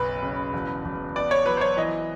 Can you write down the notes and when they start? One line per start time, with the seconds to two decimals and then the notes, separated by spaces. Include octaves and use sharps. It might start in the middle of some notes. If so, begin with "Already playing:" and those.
Already playing: F#1 B1 B4
0.23 C#3
0.53 E1
0.85 E1
1.15 B3 D5
1.31 C#5
1.46 F#3 B4
1.57 C5
1.61 C#5
1.77 E3 D#5